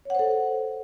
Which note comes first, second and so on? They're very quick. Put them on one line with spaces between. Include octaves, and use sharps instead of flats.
C#5 F#5 C5 A4